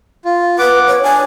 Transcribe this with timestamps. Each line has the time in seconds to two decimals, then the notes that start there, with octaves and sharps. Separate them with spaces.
0.25 F4
0.59 B4 F#5 D6
0.87 C#5
1.03 D4 G#5